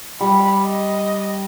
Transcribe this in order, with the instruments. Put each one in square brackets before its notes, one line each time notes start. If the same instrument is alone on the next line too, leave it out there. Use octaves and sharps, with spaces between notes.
[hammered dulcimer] G3 [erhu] B5
[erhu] D#5